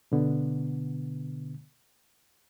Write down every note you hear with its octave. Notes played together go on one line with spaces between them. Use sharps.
B2 D3 B3